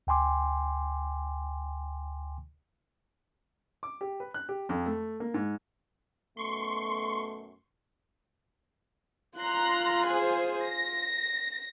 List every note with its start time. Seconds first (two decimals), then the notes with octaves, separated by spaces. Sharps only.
0.07 D2 G5 G#5 C6 D6
3.83 D6
4.01 G4
4.20 B4
4.34 F#6
4.49 G4
4.69 F2
4.86 A3
5.20 A#3
5.34 G#2
6.37 F#2 B2 A3 C6 C#6
9.38 F4 A#5 C6 F#6
10.07 G#4 C5
10.63 A#6